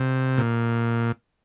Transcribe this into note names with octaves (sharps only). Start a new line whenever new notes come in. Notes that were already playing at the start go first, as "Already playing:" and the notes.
Already playing: C3
A#2